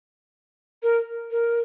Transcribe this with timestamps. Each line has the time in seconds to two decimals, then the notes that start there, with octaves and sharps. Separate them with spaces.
0.83 A#4
1.31 A#4